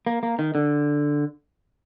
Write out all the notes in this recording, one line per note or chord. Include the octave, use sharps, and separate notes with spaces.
A#3
A#3
D#3
D3